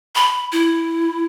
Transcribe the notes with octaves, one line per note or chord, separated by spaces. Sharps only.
B5
E4